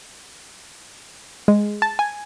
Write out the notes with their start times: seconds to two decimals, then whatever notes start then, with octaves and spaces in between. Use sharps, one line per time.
1.48 G#3
1.82 A5
1.99 G#5